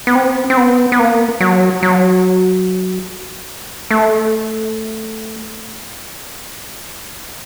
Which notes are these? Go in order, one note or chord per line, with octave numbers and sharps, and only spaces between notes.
B3
C4
C4
B3
B3
A#3
F#3
F#3
A3